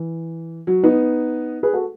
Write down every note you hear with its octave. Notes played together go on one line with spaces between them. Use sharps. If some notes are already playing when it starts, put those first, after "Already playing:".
Already playing: E3
F#3
B3 D#4
G#4 B4
F#4 A4